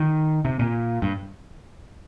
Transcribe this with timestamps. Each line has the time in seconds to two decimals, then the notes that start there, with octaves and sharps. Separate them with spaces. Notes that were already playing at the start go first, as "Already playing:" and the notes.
Already playing: D#3
0.45 C3
0.59 A#2
1.02 G2